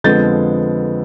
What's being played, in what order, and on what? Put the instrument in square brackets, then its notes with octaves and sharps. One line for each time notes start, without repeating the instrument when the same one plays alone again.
[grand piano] F2 D3 F3 G#3 B3 G6 A6